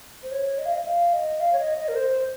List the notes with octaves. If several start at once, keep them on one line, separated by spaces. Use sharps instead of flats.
C5
C#5
D#5
F5
D#5
F5
D#5
F5
C#5
D#5
D#5
A#4
C5